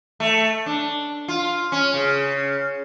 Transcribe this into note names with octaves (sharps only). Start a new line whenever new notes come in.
A3
D4
F4
C#4
C#3